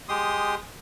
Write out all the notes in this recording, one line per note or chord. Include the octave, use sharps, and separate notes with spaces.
G#3 G4 C6 D#6